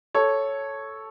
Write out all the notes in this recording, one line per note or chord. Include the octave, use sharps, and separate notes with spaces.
A4 C#5